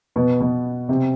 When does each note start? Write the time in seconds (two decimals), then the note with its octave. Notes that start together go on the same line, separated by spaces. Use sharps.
0.16 B2 B3
0.40 B2 B3
0.89 C3 C4